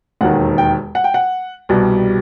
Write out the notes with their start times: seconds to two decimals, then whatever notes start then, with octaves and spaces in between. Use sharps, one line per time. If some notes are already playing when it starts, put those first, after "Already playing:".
0.21 E1 D#2 D#3 F#5
0.58 G5
0.95 F#5
1.04 G5
1.14 F#5
1.69 C2 B2 G3